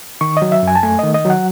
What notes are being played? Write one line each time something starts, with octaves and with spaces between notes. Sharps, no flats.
D#3 C#6
D#5
F#3
E5
F#2 G#5
A5
A3 G#5
D#3 D#5
D#5
F#3
F#5